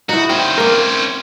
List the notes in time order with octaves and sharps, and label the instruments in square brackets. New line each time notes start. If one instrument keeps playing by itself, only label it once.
[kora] D#4 E4 [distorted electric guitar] F#4
[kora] C4 [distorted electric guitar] C#4 C5
[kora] A#3 A#4